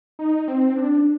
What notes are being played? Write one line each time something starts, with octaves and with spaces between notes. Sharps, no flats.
D#4
C4
D4